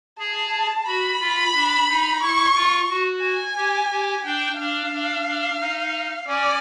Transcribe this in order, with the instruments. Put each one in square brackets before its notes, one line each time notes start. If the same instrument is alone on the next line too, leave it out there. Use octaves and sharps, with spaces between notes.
[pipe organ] G#4 [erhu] A5
[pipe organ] F#4 [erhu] B5
[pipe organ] F4
D4
D#4
[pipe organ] E4 [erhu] C#6
[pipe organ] F4
F#4
[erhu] G#5
[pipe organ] G4
G4
[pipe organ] D4 [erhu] G5
[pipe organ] D4 [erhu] F5
[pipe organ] D4
D4
D#4
[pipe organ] C#4 [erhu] D5